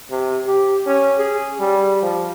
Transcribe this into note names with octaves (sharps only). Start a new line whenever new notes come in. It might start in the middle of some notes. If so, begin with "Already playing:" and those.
C3
G4
C#4
G#4
G3
F3